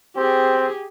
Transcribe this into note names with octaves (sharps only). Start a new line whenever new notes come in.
C4 G4 G#4